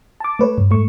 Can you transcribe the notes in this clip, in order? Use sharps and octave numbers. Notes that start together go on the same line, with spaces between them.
A5 D6
A3 B4 C#5
G2
G#2 A3 C#6